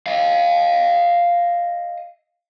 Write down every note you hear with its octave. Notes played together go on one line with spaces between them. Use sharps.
D#5 F5